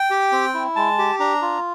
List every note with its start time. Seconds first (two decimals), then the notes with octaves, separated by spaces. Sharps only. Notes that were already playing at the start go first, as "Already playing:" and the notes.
Already playing: G5
0.11 G4
0.32 C4
0.54 E4
0.76 G#3 A5
0.98 G4
1.20 D4 A#5
1.42 F4